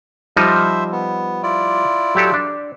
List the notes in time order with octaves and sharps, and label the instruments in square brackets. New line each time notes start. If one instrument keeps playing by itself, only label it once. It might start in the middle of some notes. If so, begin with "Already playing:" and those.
[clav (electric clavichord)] F3 G3 D#4 [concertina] C5 E5
[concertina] B3
E4 F4 D5
[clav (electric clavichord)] F#3 G4 A4
D4